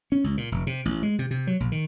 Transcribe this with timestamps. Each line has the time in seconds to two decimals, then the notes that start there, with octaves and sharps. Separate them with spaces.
0.12 C#4
0.24 C#2
0.37 A#2
0.52 F1
0.67 C3
0.85 A1
1.03 G#3
1.19 C3
1.31 C3
1.47 F#3
1.60 A#1
1.72 D#3